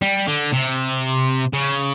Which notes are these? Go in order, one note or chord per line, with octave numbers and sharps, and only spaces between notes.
G3
D3
C3
C#3